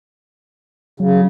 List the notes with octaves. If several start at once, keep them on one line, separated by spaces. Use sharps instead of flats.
C#3 F#3